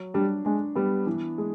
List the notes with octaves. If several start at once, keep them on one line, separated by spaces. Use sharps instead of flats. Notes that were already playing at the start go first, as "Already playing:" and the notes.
Already playing: F#3
G3 D4
G#3 D4
G3 B3
E3
G#3